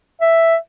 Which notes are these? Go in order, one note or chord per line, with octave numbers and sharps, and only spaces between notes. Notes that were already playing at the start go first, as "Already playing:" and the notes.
E5